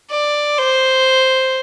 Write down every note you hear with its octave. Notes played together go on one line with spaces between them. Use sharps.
D5
C5